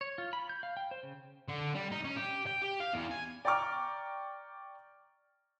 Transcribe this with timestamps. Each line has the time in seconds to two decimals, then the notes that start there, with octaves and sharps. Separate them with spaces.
0.01 C#5
0.18 F4
0.33 B5
0.49 G6
0.63 F5
0.77 G5
0.91 C5
1.03 C#3
1.48 D3
1.75 G3
1.92 D#4
2.04 C#4
2.16 G4
2.47 G5
2.62 G4
2.80 F5
2.94 E2
3.11 G#5
3.45 D5 G5 A#5 C#6 D6 F6